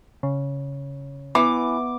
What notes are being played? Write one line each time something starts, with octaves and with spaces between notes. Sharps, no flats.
C#3
E3 B3 D6